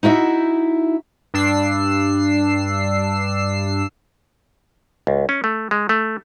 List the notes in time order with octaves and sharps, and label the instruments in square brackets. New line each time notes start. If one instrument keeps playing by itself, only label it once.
[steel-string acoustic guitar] D#4 E4 F#4 E5
[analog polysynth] G2 D4 E6 C7
[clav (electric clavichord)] C#2
C#4
A3
G#3
A3